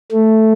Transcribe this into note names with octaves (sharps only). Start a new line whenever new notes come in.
A3